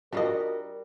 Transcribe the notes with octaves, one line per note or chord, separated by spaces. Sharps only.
G3 D4 F4 F#4 A#4 D#5 F#5